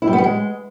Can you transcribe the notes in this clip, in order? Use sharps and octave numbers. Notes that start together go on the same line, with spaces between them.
E4
G3
B3
G3
G#3